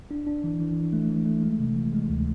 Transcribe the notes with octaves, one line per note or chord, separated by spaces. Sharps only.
D4
D4
E3
E3
E3
A3
E3
A3
G#3
C3
E3
G#3
D2